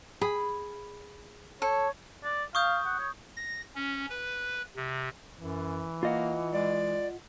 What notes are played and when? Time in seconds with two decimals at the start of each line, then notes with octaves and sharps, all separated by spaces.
0.21 G#4 B5
1.62 A4 C#5
2.24 D5
2.55 F5 C#6 D#6 G6
2.86 F#5
2.99 C#5
3.36 A#6
3.75 C#4
4.10 B4
4.76 C3
5.41 F#2 E3
6.03 A#3 F4 D#5 F#5
6.53 G#3 D5